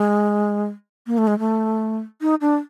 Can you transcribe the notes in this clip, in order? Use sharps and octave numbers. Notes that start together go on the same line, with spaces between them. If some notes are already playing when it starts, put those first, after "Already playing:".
Already playing: G#3
A#3
A3
G#3
A3
D#4
D4